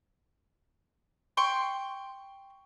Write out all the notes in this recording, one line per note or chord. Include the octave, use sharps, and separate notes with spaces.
G5 C6 C#6